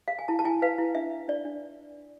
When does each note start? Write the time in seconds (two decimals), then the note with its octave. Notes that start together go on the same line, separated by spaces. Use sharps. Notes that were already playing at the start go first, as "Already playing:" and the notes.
0.08 F5
0.19 G#5
0.28 E4 A5
0.39 A5
0.45 E4 G#5
0.62 B4 F5
0.78 E4
0.95 D4 E5
1.11 D4
1.28 D4 D5
1.45 D4